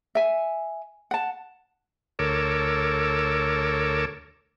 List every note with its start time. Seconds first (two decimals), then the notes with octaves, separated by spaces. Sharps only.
0.15 E5 G#5
1.11 F#5 A5
2.19 D2 A4 A#4 C#5 D6 E6